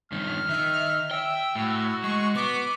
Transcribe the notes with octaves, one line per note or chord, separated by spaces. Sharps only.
G2 D#3 F6
D#3 E5
E5 G5 E6
A2 F#4
G#3 C#6
B3 D6